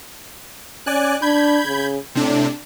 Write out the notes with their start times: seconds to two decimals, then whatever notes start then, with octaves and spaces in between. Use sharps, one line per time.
0.86 C#4 D5 G#5 F#6
1.22 D4 B5 G6 G#6
1.66 C#3
2.15 A2 C3 D4